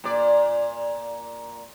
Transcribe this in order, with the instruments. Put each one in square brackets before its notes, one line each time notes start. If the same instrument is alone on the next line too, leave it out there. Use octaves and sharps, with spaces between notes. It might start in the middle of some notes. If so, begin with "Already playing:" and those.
[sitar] A#2 D5